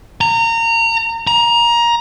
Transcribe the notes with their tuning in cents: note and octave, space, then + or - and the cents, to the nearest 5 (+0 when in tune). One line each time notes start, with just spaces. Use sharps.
A#5 -25
A#5 +20